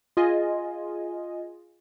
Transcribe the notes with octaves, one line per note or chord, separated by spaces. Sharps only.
F4 G#4 D#5 G#5